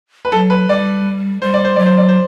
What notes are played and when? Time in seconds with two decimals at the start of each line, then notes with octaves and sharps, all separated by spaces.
0.25 B4
0.32 F#3 A4
0.50 B4
0.69 G3 D5
1.42 G3 C5
1.54 D5
1.65 C5
1.76 F#3 D5
1.86 C5
1.98 D5
2.09 C5